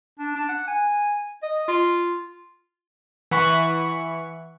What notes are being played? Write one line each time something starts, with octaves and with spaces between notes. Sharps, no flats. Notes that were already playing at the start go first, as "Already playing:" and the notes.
D4
D4
F#5
G#5
D#5
F4
E3 F#5 B5 C#6